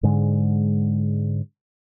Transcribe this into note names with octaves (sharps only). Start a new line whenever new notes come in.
G#2 D3 G#3